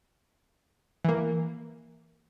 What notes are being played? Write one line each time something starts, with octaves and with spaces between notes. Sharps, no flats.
E3 A#3